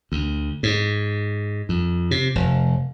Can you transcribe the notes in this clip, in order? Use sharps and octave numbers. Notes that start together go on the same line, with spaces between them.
D2
G#2
F2
C3
F1